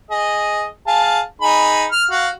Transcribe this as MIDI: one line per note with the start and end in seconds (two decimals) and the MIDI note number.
0.11 0.66 68
0.11 0.66 75
0.87 1.20 68
0.87 1.20 77
0.87 1.20 81
1.41 1.86 63
1.41 1.86 68
1.41 1.86 83
1.91 2.04 89
2.10 2.28 66
2.10 2.28 77